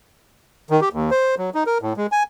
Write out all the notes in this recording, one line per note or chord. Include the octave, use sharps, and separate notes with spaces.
D#3
G4
D#2
C5
F#3
D#4
A#4
A2
G#3
G#5